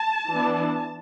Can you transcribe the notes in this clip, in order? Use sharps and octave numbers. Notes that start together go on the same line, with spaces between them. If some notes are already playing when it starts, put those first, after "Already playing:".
Already playing: A5
E3 B3 D4